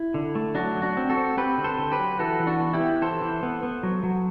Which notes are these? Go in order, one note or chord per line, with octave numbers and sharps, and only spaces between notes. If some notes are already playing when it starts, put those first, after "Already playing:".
Already playing: E4
D3
A3
F#3 D4 F#4
F#3
D4 F#4
C4
F#4 A4
C4
C4 G4 B4
D3
A4 C5
D3
G4 B4
F#3
E3 F#4 A4
E3
D4 F#4
B3
E4 G4
B3
E3 A4 C5
E3
B3
B3
F#3
F#3